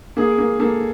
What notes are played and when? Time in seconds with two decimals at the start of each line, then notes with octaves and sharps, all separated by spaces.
0.17 A#3 G#4
0.38 A#3
0.60 A#3 A4